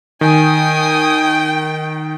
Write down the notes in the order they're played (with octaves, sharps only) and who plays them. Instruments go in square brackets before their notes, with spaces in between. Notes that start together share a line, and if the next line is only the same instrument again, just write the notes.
[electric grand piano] D#3 [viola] G5 [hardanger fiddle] G#5 D#6